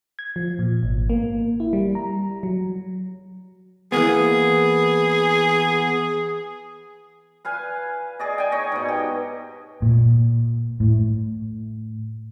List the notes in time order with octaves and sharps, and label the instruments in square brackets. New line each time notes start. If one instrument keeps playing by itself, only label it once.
[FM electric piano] G#6
F3
A#2
G#1
A#3
E4
G3
A#5
F#3
[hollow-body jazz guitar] E3 A#3 B3 [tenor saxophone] G#4
[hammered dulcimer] B4 F5 G#5
G#4 D5 D#5
G5 G#5
D#4 C#5 D#5
G#2 B2
G4
[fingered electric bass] A#2
A2